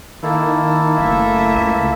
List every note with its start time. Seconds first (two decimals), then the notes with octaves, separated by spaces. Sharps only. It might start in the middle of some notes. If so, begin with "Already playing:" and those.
0.23 D#3 A#3 E4 A4
0.98 F#1 A3 E5
1.55 C#2